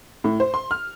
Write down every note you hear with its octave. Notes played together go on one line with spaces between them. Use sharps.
A2
C5
C6
F6